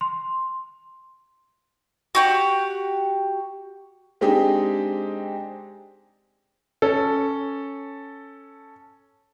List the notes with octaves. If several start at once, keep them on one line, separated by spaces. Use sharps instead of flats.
C6
F#4 G4 F#5
G#3 C4 D4 D#4 G4 G#4
C#4 A4